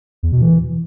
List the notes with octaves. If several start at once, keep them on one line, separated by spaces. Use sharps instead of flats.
E2
B2
E3